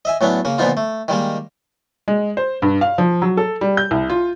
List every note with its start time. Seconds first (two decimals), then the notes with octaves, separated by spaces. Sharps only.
0.05 D#5 E5 G#5
0.21 A2 F#3 B3 C#4 D4
0.45 C#3 A#3
0.58 A#2 D3 F3 B3 D#4 F4
0.77 A3
1.08 D#3 G3 G#3 A#3
2.08 G#3
2.37 C5
2.62 G2
2.81 F5
2.98 F3
3.22 F#3
3.37 A4
3.61 G3
3.77 G6
3.91 C2
4.10 F4